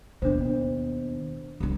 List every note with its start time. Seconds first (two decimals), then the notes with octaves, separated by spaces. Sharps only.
0.22 D#2 B2 D4 C5
1.60 C2 D4